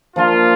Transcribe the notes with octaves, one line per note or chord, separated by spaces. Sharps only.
F3 A#3 D4 F4